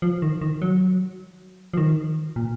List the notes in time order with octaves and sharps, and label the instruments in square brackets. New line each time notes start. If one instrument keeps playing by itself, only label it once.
[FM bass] F3
D#3
D#3
F#3
F3
D#3
A#2